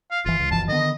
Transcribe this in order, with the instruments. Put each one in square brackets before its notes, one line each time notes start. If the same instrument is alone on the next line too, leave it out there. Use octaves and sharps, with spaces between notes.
[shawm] F5
[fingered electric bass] F#1 E3 [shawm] F4
[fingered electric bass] C#2
[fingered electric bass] F#1 E3 F3 [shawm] A5
[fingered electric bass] D3 D#3 B3 [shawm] D#5